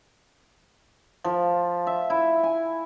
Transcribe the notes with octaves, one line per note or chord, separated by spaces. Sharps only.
F3
E5
E4
G#5